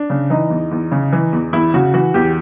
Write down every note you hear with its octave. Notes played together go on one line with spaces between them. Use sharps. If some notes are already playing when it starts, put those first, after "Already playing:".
Already playing: D4
C#3
E3 D#4
E2
E2
C#3
E3
E2
E2 E4
C#3 F#4
E3 F#4
E2 G4